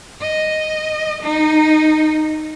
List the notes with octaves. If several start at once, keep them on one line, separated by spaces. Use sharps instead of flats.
D#5
D#4